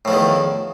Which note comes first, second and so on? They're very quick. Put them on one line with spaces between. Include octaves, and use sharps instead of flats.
A2 F3 E2 D#3